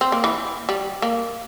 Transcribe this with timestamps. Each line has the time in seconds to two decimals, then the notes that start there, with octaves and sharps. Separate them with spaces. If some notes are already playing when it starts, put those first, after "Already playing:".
0.01 C4
0.12 A#3
0.24 E3
0.69 G3
1.02 A#3